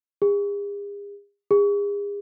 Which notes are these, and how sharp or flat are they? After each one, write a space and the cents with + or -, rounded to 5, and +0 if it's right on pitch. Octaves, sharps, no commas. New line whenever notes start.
G#4 -45
G#4 -40